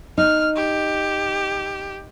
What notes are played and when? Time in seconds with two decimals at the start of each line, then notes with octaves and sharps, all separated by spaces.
0.18 D#4 F6
0.56 G4